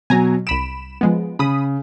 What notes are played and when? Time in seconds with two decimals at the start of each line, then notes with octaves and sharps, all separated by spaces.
0.10 B2 F#3 G#5 A#5
0.47 C2 B5 D7 E7
1.01 F3 G#3 B3
1.39 C#3 B5 D#6